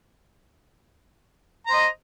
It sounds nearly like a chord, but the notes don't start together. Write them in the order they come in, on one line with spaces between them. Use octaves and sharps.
A#5 C5 D#5